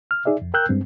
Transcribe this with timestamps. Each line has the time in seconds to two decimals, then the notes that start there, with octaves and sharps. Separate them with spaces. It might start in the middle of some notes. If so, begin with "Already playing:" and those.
0.11 F6
0.25 D#4 G#4 D5 E5
0.42 F2
0.54 A#4 G5 E6 F#6 G6
0.69 G2 G#3 C4